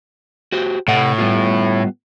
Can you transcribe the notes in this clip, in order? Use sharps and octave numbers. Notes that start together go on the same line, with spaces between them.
F#4 G4 C5
A2 C3 F#5
G3 B3 F4